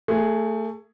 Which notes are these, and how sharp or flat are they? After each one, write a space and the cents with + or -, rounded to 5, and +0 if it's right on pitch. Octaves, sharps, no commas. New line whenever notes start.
A3 +20 G#4 +0